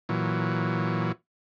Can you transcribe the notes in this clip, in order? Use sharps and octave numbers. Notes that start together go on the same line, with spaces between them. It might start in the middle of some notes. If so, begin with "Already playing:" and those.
A#2 E3 F#3